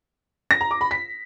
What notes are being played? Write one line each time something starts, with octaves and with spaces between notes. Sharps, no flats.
A#6
A#5
D6
B5
B6